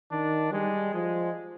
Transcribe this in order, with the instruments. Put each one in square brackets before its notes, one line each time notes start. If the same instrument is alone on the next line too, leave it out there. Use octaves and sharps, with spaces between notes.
[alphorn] D#3 [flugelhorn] D4
[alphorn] G3 [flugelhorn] G#3
[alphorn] F3 [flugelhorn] G#3